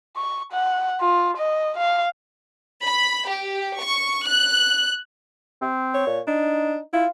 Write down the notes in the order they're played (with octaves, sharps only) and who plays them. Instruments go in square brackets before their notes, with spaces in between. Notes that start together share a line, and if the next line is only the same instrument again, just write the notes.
[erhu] C#6
F#5
F4
D#5
F5
[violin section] B5
G4
C#6
F#6
[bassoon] C4
[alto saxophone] C#5
[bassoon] A#2
[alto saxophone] D4 [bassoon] D#4
[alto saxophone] E4 [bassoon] F4